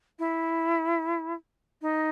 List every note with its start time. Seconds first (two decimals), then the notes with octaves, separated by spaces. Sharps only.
0.19 E4
1.82 D#4